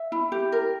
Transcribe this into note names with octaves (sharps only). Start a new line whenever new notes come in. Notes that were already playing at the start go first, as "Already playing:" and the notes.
Already playing: E5
E4
G4
A#4